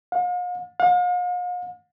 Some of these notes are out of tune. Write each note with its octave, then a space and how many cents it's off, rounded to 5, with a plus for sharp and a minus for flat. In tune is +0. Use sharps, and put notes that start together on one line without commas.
F5 +45
F5 +45